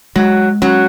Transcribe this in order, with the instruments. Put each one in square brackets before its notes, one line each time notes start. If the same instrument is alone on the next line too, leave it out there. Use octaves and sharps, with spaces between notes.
[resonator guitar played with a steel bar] F#3 [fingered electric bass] G#3
[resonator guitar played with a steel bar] F#3 [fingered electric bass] C#4